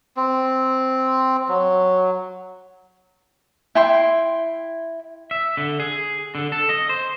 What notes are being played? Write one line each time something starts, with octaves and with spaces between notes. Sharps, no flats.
C4
F#3
E4 G5 C6
E5
D3
G#4
D3
A4
D#5
C5